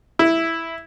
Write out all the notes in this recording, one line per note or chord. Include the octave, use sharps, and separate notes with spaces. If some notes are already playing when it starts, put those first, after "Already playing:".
E4